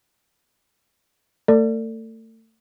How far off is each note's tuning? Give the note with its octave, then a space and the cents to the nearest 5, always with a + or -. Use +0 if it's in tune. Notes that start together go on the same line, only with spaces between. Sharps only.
A3 +30 A4 +40 D5 +0